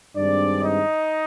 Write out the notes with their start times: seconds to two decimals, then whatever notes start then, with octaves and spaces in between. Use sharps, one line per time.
0.16 G2 D#3 G#3 C4 D4 D5
0.62 D#4 D#5